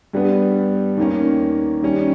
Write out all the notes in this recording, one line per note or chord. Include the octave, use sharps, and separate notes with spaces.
G2 G3 B3
D#2 D#3 A#3 C#4
D#3 G3 C#4